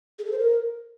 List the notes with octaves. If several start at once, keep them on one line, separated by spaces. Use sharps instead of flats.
G#4
A4
C5
A#4